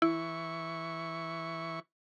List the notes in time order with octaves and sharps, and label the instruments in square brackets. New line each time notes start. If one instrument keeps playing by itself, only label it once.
[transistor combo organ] E3 C#6 [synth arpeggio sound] E4